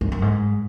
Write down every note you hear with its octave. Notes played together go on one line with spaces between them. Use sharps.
G#2
F2
F#2
G#2